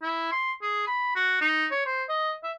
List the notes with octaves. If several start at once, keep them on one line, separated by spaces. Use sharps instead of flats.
E4
C6
G#4
B5
F#4
D#4
C#5
C5
D#5
E5